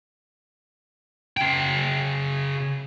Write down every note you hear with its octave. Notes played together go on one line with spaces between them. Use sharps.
C#3 G5